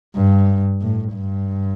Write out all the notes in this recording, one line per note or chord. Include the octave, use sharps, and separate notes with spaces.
G2
A2
G2